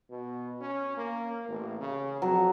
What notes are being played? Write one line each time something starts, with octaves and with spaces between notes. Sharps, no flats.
B2
C#4
A#3
A1
C#3
F2 F#3